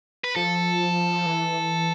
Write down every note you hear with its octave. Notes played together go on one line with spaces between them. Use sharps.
B4
F3 A4
E3